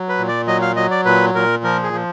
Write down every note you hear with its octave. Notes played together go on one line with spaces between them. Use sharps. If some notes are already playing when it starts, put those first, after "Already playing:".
Already playing: F#3
B4
A#2
D5
F#3 D#5
F5
F#3 D#5
D5
A#2 B4
A#2 A#4
F3 A#4
G#4
F3